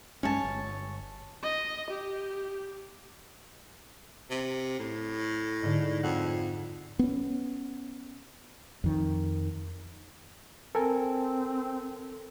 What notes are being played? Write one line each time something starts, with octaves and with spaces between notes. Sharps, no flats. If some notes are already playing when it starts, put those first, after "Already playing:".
G2 G#3 C#4 C#5 G#5 A5
G1
D#5
G4
C3
A2
G#2 D3
F2 F#5
B3 C#4
F2 D#3
C4 A4 A#4 G#5